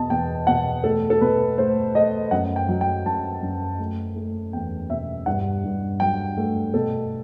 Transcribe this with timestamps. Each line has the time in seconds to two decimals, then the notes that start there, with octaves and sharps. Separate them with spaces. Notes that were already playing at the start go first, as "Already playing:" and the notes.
Already playing: E2 B2 D#5 A5
0.10 E2 G5
0.47 B2 F#5
0.84 A3 A4
1.10 A4
1.21 B2 B4
1.58 A3 C5
1.95 A3 D#5
2.31 F#2 F#5
2.56 G5
2.68 F#3
2.81 G5
3.05 F#2 A5
3.42 F#2
3.79 A3
4.15 A3
4.53 E2 G5
4.90 B2 E5
5.26 G2 F#5
5.64 G2
6.00 F#3 G5
6.37 A3
6.74 B2 A4